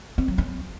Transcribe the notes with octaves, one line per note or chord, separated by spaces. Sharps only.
C4
F#3
C#4